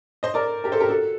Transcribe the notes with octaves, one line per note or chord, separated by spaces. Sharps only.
C5 D#5
A#4 D5
G4 A#4
A4 C5
G4 A#4
F#4 A4